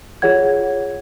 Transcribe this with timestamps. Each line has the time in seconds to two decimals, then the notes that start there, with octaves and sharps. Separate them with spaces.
0.22 F4 G#4 C#5 F#5 G#6